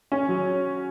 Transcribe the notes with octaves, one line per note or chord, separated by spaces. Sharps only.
C#4
F#3